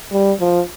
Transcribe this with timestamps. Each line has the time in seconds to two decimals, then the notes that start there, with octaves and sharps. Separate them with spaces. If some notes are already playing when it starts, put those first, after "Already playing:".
0.12 G3
0.40 F3